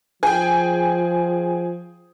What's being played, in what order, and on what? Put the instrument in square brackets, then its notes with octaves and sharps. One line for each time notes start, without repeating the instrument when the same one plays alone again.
[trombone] F3 [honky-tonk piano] G#4 G5